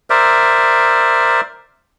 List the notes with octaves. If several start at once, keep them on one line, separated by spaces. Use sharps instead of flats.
A#4 C5 D5 E5